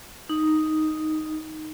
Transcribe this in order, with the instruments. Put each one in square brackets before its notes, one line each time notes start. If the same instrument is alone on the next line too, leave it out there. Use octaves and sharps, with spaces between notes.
[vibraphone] D#4